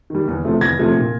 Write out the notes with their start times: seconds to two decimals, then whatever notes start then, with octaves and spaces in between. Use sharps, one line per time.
0.10 D#3 G3
0.28 E2
0.45 C3 F3 A3
0.61 E2 G#6 A#6
0.79 C3 F3 A3
0.97 A#2